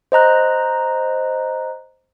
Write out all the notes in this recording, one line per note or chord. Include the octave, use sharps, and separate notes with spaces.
C5 D#5 A#5 F#6